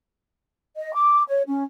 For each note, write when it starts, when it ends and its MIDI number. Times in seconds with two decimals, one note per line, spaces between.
0.76 0.93 75
0.94 1.23 86
1.28 1.42 73
1.47 1.62 61